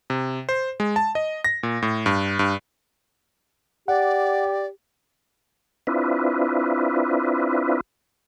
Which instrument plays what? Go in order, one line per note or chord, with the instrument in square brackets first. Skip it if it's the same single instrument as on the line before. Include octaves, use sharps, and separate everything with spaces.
[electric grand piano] C3
C5
G#3
A5
D#5
A#6
A#2
A2
G2
G2
[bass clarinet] G4 [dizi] D5 [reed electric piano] F#5
[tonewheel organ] C4 D4 E4 F4 B4